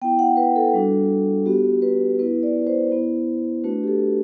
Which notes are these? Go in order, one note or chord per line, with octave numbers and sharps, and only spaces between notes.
B3 E4 G5
F#5
B4
A4
G3 D4 F#4
B3 F#4 G4
B4
B3 E4 B4
D5
D5
C5
B3 E4
A3 D4 F#4 B4
G4
A4